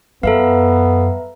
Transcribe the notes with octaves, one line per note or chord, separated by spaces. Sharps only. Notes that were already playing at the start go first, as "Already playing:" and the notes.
F#2 B3 A4 B4 E5 F5 A#5